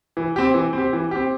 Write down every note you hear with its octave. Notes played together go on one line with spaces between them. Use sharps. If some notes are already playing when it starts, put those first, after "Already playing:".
E3
C4 G4
E3
C4 G4
E3
C4 G4